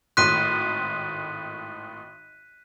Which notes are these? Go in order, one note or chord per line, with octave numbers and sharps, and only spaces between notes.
G#1 A2 C6 F#6 B6 D#7